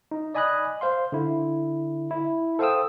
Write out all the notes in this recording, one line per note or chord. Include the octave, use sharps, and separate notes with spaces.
D#4
D5 D#5 G#5 B5 D#6 F#6
C5 F5 C6
D3 E4
E4
A4 C5 F5 G5 D#6 E6